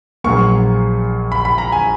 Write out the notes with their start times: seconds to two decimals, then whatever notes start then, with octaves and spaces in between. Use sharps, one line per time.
0.24 A#1 A#2 F#3 A#3 C#6
1.32 B5
1.45 B5
1.58 A#5
1.72 G#5